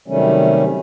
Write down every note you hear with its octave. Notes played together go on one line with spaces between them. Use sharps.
C3 D#3 F#3 G3 A3 C#4